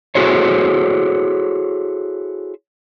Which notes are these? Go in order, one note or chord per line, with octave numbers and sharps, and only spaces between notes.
E4 F#4 G#4 A4 C5 C#5